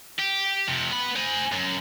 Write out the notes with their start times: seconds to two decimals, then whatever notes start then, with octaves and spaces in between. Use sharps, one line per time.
0.19 G4
0.68 F2 C3
0.91 B3 B5
1.16 C5 G#5
1.52 F#2